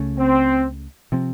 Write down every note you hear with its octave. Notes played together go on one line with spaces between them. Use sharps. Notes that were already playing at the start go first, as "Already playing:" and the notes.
Already playing: C#2 C#3 A3 C#4
C4
C3 F3 C4